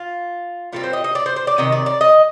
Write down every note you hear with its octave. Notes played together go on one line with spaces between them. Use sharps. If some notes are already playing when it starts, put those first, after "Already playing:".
Already playing: F4
A#2 G3 C4 F4
C5
D#5
D#5
D5
C5
C5
D5
C3 D#3 D#5
D5
D5
D#5